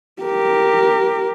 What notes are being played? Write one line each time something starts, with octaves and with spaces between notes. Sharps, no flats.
G4 A#4